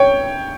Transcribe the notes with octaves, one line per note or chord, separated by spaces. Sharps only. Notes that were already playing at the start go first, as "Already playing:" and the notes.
Already playing: C#5 G5